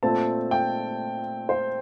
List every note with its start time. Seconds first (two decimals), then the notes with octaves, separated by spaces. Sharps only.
0.03 A#2 A3 C4 A5
0.51 G5
1.49 C5